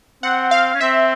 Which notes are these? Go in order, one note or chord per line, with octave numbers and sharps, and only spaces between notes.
C4 F#5
F5
C#4
C4 E5